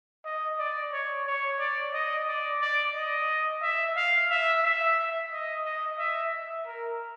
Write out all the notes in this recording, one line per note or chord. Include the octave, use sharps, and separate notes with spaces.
D#5
D5
C#5
C#5
D5
D#5
D5
D5
D#5
E5
F5
E5
E5
D#5
D#5
E5
E5
A#4